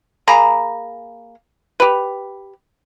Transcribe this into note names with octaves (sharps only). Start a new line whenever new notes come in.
A#3 G#4 A#5 B5
G4 B4